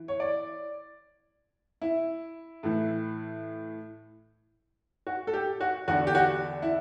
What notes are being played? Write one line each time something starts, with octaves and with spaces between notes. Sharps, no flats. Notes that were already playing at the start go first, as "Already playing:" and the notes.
Already playing: E3
C#5
D5
E4
A2 E3
F#4
A4
G4
F#4
E2 D3 F#4
G4
F#4
E4